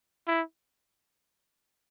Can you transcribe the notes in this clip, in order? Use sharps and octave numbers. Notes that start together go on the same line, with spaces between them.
E4